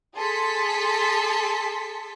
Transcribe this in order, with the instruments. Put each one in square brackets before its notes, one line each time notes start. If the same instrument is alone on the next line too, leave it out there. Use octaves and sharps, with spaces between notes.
[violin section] G#4 A4 A5 C6 B6 C#7